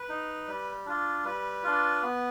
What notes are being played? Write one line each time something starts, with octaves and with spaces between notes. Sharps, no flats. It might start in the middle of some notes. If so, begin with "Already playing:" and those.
Already playing: B4
D#4
G3
D4 F4
G3 B4
D4 F4
B3